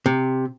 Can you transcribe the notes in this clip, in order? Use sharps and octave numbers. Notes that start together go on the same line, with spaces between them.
C3